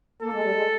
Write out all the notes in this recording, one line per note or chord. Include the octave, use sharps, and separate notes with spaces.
A#3 A4
G#3
G3
G#3